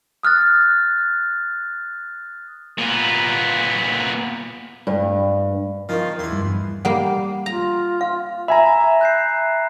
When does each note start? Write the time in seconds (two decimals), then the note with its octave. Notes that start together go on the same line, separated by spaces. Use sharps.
0.23 D#6 F6 F#6 A6
2.78 A#2 B3
4.87 G2
5.89 D#3 F3 C#4
6.19 E2 G#5 C6
6.32 G2
6.85 G3 A#3 F#5
7.46 F4 A#5
8.01 F5
8.48 E5 G#5 A#5 B5
9.01 F#6 G6 C7